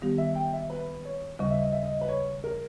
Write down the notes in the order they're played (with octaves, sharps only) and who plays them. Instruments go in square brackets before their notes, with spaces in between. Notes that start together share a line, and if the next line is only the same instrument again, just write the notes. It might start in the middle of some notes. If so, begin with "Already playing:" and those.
[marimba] D#3 G3 B3 G4
[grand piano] E5
G5
E5
B4
C#5
[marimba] D#2 C#3 G3 [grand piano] D#5
[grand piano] E5
D#5
E5
D#5
B4
C#5
A#4